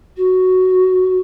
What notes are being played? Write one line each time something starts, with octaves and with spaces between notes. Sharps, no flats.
F#4